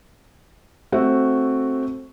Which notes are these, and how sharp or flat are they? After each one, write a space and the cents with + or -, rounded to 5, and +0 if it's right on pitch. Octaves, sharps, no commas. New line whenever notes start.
A3 +0 C4 +10 F#4 +0